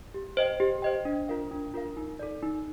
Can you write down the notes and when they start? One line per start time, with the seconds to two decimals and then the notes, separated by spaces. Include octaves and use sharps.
0.14 G4
0.37 C5 D#5 G5
0.60 G4
0.82 C5 D#5 G5
1.05 D4
1.29 F4 A#4 F5
1.51 D4
1.74 F4 A#4 F5
1.97 D#4
2.19 A4 D5
2.43 D#4